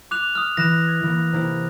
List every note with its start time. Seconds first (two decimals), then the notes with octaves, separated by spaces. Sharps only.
0.11 D6 F#6 F7
0.35 D#6 F6
0.57 E3 F#6 A#6 E7
0.86 G#6 A6
1.03 E3 A#3
1.33 C3 A#3 E4